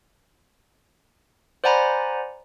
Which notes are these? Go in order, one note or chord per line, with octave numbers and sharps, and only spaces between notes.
C5 D5 F#5 G#5 A#5 B5